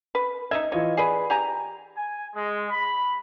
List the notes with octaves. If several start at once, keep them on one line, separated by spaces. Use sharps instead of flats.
B4
D#4 D#5 E5 G#6
E3 F4 C#5 D#5
G#4 B4 D5
G4 G#5 A#5
G#5
G#3
B5